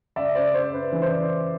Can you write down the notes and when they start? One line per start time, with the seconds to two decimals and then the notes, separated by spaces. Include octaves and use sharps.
0.16 C#2 D5 E5
0.35 C#3 C5 D5
0.54 C#3 C5
0.73 C#3 B4
0.92 E3
1.02 C5